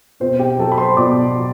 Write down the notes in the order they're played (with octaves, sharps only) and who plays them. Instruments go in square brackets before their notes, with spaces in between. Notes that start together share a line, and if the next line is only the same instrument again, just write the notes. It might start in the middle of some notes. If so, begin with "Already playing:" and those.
[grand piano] B2 C4 C5
G4 G5
F#3 A4 A5
B5
C5 C6
B2 D5 D6
F#3